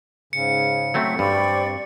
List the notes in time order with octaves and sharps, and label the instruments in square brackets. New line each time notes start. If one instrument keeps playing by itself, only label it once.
[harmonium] G#2 C#3 [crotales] C#7
[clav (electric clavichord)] F#3 A3 C4 [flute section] E5
[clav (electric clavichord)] G2 [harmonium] C4 C5 [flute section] D5 B5 C#6